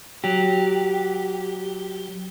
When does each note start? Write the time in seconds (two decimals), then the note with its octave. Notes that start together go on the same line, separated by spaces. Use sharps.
0.24 F#3 G4